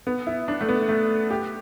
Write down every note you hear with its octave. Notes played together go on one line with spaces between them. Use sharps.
B3
E4
D4
A3
B3
A3
G4